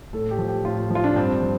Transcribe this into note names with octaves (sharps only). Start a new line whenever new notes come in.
A2 A4
G4
F3
G4
A2 F4
F3
F4
D4
G2 C4
F3